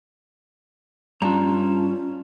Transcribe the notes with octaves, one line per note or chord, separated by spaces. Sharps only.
G2 C#4 F4 A5 A#5